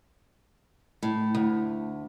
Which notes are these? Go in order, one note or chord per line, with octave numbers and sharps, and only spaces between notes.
A2
D2